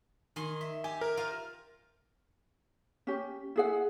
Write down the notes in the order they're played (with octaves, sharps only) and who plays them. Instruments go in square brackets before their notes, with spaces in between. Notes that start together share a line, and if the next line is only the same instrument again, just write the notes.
[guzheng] D#3 G#5 C6
E5
[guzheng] G4 [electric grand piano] G#5
[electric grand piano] A#4
[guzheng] F4 C5 F5
[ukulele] C#4 G4
E4 G#4 F#5